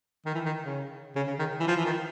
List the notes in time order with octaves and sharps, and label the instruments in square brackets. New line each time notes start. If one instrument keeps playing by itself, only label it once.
[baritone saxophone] D#3
E3
D#3
C#3
C#3
C#3
D#3
E3
F3
E3
D#3